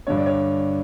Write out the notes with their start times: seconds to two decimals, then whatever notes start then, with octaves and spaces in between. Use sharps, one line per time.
0.07 G2 D3 C#5
0.17 D5
0.26 C#5